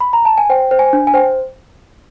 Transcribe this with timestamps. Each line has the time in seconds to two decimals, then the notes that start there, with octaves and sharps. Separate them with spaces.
0.00 B5
0.13 A#5
0.25 A5
0.38 G#5
0.50 C5 G5
0.71 C5
0.79 G#5
0.93 D4
1.07 G#5
1.14 C5 G5